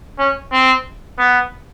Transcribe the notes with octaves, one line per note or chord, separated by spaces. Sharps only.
C#4
C4
B3